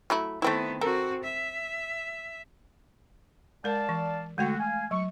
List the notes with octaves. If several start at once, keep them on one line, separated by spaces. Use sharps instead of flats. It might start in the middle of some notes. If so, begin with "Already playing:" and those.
F#3 A3 E4
D#3 A3 B3 C4 E4
C4 F#4 A4 A#4
E5
G#3 A#4 D5 F5 A5
E3
D3 G#3 A3 F#4 G5
F5 G#5
F#3 C#6